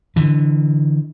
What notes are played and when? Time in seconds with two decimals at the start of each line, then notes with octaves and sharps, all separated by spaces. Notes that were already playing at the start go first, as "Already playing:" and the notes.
0.16 D3 E3